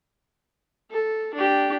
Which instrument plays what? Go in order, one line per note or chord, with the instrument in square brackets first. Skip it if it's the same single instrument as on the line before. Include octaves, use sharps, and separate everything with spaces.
[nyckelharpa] A4
D4 G4